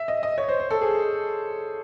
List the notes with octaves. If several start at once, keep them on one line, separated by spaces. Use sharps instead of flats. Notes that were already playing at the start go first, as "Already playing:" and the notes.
Already playing: E5
D#5
D#5
C#5
C5
C5
A4
G#4